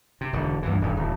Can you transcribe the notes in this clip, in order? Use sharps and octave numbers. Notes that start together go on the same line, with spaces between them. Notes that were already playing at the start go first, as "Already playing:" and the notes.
C3
E1 D3
D2 G2 A#2 E3
D#1 G2
D1 E2